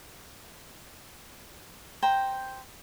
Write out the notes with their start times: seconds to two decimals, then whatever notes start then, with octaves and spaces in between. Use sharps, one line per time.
2.02 C5 G5 A#5